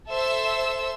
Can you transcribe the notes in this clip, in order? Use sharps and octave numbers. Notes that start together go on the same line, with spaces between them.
A4 C5 E5 E6